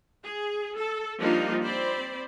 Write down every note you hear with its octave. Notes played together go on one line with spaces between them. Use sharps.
G#4
A4
F3 G3 A#3 D4 D#4 F4
C4 C5 D5 B5